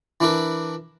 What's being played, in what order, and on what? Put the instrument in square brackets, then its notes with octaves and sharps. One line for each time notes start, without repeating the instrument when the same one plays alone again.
[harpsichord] E3 D4 E4 A#4 B4